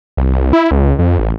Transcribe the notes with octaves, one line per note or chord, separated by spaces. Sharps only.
C2
C2
E4
C#2
F2
A1